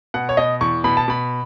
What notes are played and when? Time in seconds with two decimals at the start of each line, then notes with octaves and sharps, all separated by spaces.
0.14 B2 F#5
0.29 C#5
0.37 B2 D#5
0.61 E2 C#6
0.84 B2 B5
0.97 A5
1.08 B2 B5